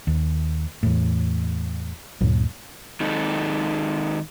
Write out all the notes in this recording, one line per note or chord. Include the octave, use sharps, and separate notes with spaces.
D#2
E2 A2
D2 G2 A#2 F#3
D#3 G#3 C4 D#4 A4